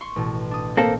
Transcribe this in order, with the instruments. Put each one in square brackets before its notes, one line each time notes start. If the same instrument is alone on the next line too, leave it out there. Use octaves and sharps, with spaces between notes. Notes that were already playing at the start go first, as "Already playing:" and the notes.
[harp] C6 C#6
A1 B2
D4 D#6
[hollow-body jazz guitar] A#3 C4 A4